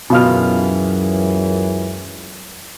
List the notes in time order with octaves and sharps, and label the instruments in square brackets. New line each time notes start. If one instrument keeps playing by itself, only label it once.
[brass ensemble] C#2 F#2 E3 [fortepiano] B2 F4 F6